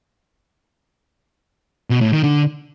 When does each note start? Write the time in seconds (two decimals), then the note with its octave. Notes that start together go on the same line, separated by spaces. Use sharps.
1.90 B2
2.01 A2
2.12 D#3
2.24 D3